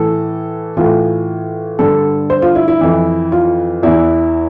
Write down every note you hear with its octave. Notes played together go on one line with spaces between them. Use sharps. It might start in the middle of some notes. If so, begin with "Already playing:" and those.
Already playing: A2 E3 A4
A2 E3 F4
G2 D3 A4
C5
F4
E4
E4
F2 E3
F4
E2 E3 E4